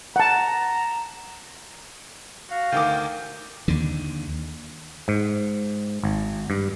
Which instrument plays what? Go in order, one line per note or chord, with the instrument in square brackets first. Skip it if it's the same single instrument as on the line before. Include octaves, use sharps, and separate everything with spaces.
[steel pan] F#5 A5 [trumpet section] A#5
[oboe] F#4 [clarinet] F5
[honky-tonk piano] D2 D#3 D6 [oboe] G5
[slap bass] D#2 D3
[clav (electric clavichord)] G#2
G#1
G2